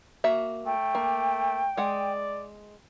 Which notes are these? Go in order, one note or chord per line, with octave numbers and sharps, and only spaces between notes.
A#3 F#4 E5
A3 G5
A#3
G#3 D5 F#5